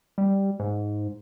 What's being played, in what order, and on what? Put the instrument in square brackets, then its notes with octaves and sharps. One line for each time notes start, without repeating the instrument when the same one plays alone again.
[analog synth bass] G3
G#2